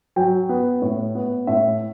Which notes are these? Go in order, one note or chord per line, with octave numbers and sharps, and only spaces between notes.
F#3 G5
B3
A2
B3
A2 E5